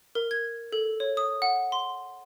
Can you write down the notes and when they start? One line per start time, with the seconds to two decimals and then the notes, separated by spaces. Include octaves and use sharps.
0.15 A#4
0.31 G#6
0.73 A4
1.00 C#5
1.17 D#6
1.42 F#5
1.72 C6